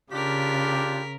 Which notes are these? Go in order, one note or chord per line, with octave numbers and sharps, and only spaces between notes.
C#3 D4 F4 G4 A#4 B6